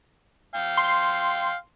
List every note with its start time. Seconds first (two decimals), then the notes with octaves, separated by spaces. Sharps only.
0.55 F5 G5
0.77 C6